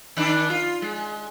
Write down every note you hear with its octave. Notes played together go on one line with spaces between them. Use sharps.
D#3 D4
F4
G#3